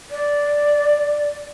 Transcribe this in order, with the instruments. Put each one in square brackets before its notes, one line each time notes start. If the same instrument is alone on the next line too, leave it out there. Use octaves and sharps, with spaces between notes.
[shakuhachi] D5